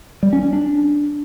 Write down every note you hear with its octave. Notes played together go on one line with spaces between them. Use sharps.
G3
C#4
C#4
D4